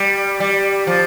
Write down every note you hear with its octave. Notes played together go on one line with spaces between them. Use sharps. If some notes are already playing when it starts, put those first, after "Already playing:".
Already playing: G3
G3
F3